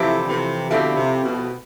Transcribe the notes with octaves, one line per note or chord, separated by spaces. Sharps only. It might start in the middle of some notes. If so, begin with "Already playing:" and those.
Already playing: C3 E3 F3 A3 C4 E4 G4
D3
C3 E3
B2 D3 F3 A3 C4 E4 G4
C3
B2